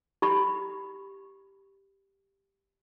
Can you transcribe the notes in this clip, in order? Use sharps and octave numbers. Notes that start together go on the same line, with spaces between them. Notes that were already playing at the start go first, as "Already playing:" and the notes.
G4 B5